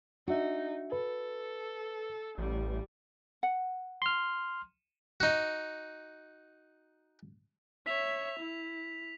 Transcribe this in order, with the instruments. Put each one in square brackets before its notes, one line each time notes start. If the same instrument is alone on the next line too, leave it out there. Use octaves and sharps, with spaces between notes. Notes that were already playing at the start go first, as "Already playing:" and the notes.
[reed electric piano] D4 E5 [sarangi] D#4 [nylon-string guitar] F#4
[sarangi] A4 [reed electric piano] B4
[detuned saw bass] A1 [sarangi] G3
[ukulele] F#5
[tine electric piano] C6 F6
[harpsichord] D#4 F#4
[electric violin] C#5 E5 [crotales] B6 F7
[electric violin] E4